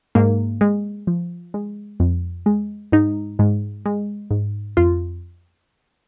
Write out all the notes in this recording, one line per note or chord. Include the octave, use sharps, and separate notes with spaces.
G#2 A#3
G#3
F3
G#3
F2
G#3
G#2 D#4
G#2
G#3
G#2
F2 F4